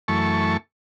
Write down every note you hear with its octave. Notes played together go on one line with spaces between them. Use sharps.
F#2 E3 A3 A5 C#6